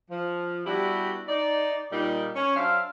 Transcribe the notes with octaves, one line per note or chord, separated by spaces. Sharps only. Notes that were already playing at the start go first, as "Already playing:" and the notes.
F3
G3 B3 D4 E4 F#4 G4
D#4 D5
A#2 G3 D#4
C#4
F#3 D4 C5 E5 F5